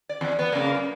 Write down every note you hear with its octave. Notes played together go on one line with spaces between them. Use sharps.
D5
E2
B3
F2 C#3 A#3
F#2